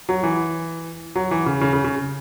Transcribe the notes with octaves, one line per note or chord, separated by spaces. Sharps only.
F#3
E3
F#3
E3
C#3
C#3
C#3
C#3